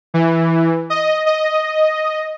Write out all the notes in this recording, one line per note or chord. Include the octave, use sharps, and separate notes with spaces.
E3
D#5
D#5